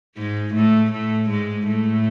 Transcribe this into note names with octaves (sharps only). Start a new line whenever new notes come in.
G#2 G#3
A2 A3
A2 A3
G#2 G#3
A2 A3